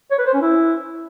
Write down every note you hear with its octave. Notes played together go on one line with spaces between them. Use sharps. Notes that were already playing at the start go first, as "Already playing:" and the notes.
C#5
B4
C5
C#4
E4